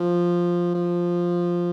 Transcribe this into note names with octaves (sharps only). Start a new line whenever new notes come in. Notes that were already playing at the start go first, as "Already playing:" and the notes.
Already playing: F3
F3